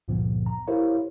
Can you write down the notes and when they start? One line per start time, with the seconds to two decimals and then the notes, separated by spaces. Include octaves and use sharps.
0.08 C#2 G2 A#2 D3 F3 B3
0.46 A#5
0.67 E4 G4 A#4 C5 C#5 F5